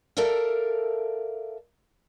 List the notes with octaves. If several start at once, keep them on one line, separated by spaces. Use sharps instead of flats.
A4 A#4 D5 E5 F5